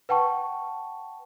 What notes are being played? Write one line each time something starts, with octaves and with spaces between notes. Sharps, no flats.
B4 F#5 G5 A5 C#6